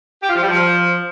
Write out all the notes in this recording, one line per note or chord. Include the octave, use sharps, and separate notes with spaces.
G4
F4
F3
G3
F3